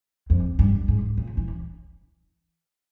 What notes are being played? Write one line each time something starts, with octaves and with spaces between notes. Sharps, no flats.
F2
G2
G#2
A#2
E3